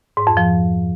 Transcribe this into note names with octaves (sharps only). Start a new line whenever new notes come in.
G#2
F2
F3